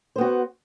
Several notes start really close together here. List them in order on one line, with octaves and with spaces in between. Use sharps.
C5 B3 F#4